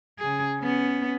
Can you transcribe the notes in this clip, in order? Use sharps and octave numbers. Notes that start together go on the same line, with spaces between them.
C#3 G#4
B3 C#4